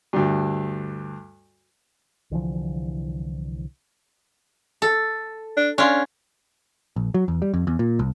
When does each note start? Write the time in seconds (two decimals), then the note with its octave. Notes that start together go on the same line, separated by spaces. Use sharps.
0.13 D2 G2
2.31 C2 D3 E3 F3
4.82 A4
5.57 D4
5.78 C#4 D4 F4
6.96 A#1
7.14 F#3
7.28 E2
7.42 G3
7.54 F2
7.67 E2
7.79 A#2
7.99 C2